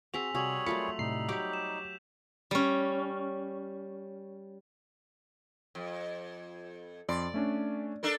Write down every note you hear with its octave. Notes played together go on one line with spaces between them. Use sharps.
C4 F#4 G#4 E6 B6 F7
C3 G3 F#4 G#4 C#5 E6 F7 F#7
F#3 A3 F4 A#4 B5 C#7
A2 C3 G3 D#4 C7
F#3 G4 C#5 C#6 D6 G6 B6
E7
G3 C#4
F2
F2 D5 C6
A3 C#4 D4
D4 A4 A#4